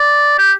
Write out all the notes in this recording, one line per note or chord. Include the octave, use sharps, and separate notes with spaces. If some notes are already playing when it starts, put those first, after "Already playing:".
Already playing: D5
G4